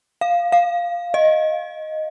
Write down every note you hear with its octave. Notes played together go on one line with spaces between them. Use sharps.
F5
F5
D#5